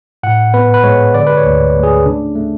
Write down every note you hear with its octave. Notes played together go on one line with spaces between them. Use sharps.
A2 F#5
B3 B4
B4
G#3 C#5
D3 D5
B4
C#5
D2
A3
G#4
C#3 D4
A3